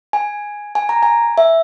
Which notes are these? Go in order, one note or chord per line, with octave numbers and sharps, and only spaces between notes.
G#5
G#5
A#5
G#5
E5